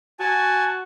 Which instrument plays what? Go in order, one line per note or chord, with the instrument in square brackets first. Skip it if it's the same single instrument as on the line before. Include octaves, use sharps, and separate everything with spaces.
[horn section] F#4 [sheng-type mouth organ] G#5 A5